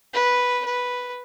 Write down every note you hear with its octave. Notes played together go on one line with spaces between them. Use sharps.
B4
B4